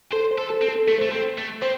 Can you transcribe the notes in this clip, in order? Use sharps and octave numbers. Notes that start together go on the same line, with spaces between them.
A4 C5
C5
A4
A4
C4
A4
A3 A4
A3 C5
C4 A4
A3
C4 C5